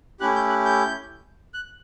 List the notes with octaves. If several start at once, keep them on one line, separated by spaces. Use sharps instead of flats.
A3 C#4 E4 G4 F#6
G6
F#6
G6
F#6